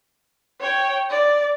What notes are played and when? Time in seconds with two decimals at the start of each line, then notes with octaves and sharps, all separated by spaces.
0.61 C#5 G5
1.10 D5